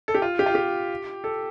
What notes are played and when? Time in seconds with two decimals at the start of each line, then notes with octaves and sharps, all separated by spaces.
0.08 A4
0.15 G4
0.22 F4
0.39 G4
0.46 F4
0.55 G4
1.24 A4